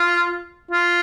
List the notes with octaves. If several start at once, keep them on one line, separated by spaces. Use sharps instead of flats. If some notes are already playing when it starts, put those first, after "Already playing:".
Already playing: F4
F4